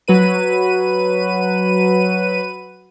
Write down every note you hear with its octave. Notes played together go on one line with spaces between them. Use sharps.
F#3 B4 D#7